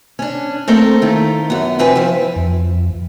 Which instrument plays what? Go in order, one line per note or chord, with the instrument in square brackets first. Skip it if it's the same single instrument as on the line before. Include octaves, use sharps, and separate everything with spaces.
[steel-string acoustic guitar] C#4 D4
A3 A#3 C4 A4 A#4 C5
D#3 E4 F4
F#2 B3
F#2 C3 F3 C4 B4 G#5
F3 E4
[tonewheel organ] F2